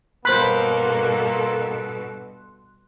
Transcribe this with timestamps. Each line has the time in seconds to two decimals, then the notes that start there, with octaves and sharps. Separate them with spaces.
0.25 G2 B2 A#3 A4 C5 B5 C6 F#6